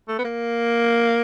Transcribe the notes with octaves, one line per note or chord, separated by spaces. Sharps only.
A3
B3
A#3